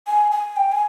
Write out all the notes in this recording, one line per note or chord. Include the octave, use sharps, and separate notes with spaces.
G#5
G#5
G5
G#5